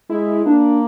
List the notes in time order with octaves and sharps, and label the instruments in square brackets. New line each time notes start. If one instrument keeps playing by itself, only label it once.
[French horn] G#3 [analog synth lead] E4
[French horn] A#3 [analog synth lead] D4